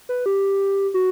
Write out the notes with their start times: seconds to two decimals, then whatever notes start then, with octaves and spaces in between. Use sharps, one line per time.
0.09 B4
0.26 G4
0.94 F#4